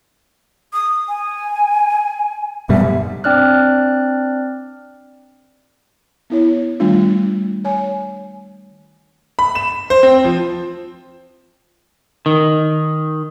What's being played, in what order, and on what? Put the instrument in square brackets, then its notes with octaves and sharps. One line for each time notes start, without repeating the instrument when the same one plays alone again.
[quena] D#6
G#5
[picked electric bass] F#2 B2 G3 [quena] E5
[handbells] C4 D4 D5 F6 F#6
[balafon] B3 E4 C#5
D#3 G3 A3 D4 F4
C#5 G#5
[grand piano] B5
E7
C5
C4
F3
[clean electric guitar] D#3